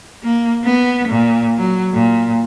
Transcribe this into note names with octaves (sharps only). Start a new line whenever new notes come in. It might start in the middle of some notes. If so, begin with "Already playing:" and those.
A#3
B3
A#2
F#3
A#2